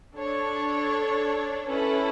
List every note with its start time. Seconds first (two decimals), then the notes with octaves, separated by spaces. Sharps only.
0.16 D4 A4 C#5
1.66 C#4 E4 A4 B4